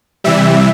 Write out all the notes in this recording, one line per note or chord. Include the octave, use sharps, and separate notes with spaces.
C3 E3 G3 E5